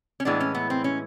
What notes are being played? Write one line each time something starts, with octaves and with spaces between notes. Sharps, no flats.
C#4
A2 E3 G#3 B3 D4
C#4
B3
C4
C#4